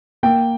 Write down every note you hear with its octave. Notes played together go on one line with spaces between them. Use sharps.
A#3 G5